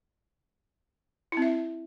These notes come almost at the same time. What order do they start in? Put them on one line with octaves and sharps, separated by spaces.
E4 C4 E5